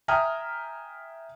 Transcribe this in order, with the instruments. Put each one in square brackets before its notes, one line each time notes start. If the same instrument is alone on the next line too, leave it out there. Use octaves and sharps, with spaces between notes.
[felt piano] E5 G5 G#5 A#5 D#6 F6